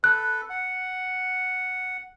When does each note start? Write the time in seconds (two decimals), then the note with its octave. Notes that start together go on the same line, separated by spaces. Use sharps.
0.04 A4 B4 F#6
0.50 F#5